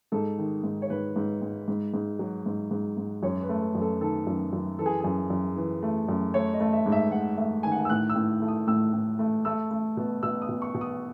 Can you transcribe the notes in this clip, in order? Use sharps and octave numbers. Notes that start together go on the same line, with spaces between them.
G#2 A4
D#3
G#2
C#5
G#2 B4
G#2
G#2
G#2
G#2
F#3
G#2
G#2
G#2
F#2 C#5
B4
A3
A4
F#2
A4
D#3 A4
F#2
F#2
E3 A4
G#4
F#2 G#4
F#2
E3
A3
F#2
A3 C#5
D#5
A3
E5
G#2
E5
G#2 F#5
A3 E5
D#3 G#5
F#5
G#5
E6
A2 F#6
E6
A2
A3
D#6
A2 E6
A2
A3
A3 E6
A3
B2
B2 E6
D#6
B2
C#6
B2
D#6